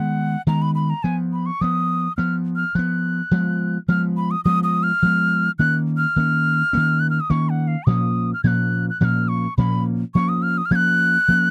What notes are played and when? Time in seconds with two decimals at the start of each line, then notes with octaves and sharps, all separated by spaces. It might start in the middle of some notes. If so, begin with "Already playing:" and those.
Already playing: D#3 G#3 B3 F#5
0.47 D#3 G#3 B3 A#5
0.62 B5
0.75 B5
0.90 A#5
1.03 F3 B3 G#5
1.33 B5
1.46 C#6
1.61 F3 B3 D#6
2.17 F3 B3 F6
2.56 F6
2.75 F3 B3 F#6
3.31 F3 G#3 B3
3.88 F3 G#3 B3 F6
4.17 B5
4.31 D#6
4.45 F3 G#3 B3 D#6
4.64 D#6
4.83 F6
5.02 F3 G#3 B3
5.59 D#3 A#3 C#4 F#6
5.97 F6
6.16 D#3 A#3 C#4
6.73 D#3 A#3 C#4
7.00 F#6
7.10 F6
7.20 D#6
7.30 D#3 A#3 C#4 C#6
7.49 F#5
7.67 F5
7.86 A#2 F3 A#3 C#4 D#6
8.33 F6
8.44 A#2 F3 A#3 C#4 F#6 G#6
8.90 F#6
9.00 A#2 F3 A#3 C#4 F6 F#6
9.28 C#6
9.58 A#2 F3 A#3 C#4 B5
10.14 F3 A#3 C#4 C#6
10.29 D#6
10.43 F6
10.58 D#6
10.66 F6
10.71 F3 A#3 C#4 F#6 G#6
11.28 F3 A#3 C#4